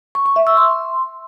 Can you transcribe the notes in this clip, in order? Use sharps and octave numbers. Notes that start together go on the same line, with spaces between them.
C#6
C#6
E5
E6
C6